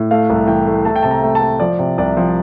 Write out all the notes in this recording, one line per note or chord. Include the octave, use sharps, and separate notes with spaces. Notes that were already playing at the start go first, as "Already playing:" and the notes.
Already playing: A2
A3 F5
C2
E3 G5
A3
A3 A5
G5
C3 A5
A#5
A3
A5
A3
F3 D5
C3
C2 D5
F3